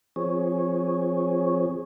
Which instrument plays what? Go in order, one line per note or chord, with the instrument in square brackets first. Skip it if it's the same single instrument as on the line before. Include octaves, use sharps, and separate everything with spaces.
[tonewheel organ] F3 C4 G#4 C#5